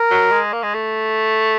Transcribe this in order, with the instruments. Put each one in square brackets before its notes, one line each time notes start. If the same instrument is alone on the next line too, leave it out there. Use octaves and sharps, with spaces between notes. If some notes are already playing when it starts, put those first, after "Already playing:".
Already playing: [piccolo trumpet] A#4
[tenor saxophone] F#3
G#3
A#3
G#3
A3